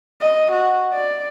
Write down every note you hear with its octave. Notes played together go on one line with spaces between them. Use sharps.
D#5
F#4
D5